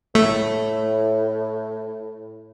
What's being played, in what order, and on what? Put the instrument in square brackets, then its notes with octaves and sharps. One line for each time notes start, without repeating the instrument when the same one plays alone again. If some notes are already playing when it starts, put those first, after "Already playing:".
[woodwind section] A2 [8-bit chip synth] A3